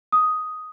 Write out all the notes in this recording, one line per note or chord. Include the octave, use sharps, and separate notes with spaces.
D#6